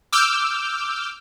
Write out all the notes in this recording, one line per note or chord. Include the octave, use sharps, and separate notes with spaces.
D6 E6 F6 G6